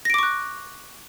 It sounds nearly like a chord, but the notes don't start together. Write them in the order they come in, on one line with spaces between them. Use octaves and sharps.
A#6 D7 D6 C#6 F#6